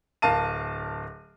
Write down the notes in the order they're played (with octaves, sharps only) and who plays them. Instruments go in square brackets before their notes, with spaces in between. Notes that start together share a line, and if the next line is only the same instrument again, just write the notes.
[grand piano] D1 A#4 F5 A5 D#7